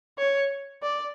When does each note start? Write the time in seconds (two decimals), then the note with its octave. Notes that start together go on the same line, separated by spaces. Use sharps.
0.18 C#5
0.82 D5